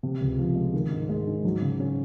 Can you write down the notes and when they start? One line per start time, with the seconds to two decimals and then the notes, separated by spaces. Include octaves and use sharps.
0.03 C3
0.21 C#2
0.38 F3
0.56 G#3
0.74 D#3
0.91 G#2
1.09 G#3
1.27 G#2
1.45 F#3
1.62 C#3
1.80 C#4